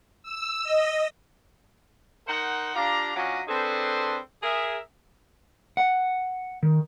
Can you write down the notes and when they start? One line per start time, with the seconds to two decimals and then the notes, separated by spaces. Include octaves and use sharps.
0.23 E6
0.64 D#5
2.28 D#4 A#4 C5 F#5
2.75 D4 F4 G4 F5 A#5
3.16 F#3 C#4 D4 F4 C#5 D#5
3.48 C4 D4 G#4 A4 B4 C5
4.43 G#4 A#4 E5
5.77 F#5
6.63 D#3